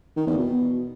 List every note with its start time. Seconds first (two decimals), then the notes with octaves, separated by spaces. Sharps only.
0.17 D#3
0.27 E2
0.37 B2